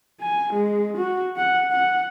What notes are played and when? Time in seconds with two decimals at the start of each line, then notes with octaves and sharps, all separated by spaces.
0.21 G#5
0.53 G#3
0.97 F#4
1.36 F#5
1.71 F#5